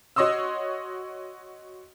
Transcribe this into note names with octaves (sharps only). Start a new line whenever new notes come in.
F#4 C#5 D#5 C6 D#6 E6